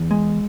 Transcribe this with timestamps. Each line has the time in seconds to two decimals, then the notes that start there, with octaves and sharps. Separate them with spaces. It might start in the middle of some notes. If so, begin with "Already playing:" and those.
Already playing: E2
0.11 G#3